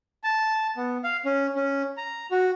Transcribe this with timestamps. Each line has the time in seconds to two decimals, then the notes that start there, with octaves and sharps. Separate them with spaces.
0.24 A5
0.77 B3
1.04 F5
1.25 C#4
1.55 C#4
1.97 A#5
2.31 F#4